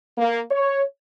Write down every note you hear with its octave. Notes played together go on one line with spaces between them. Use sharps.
A#3
C#5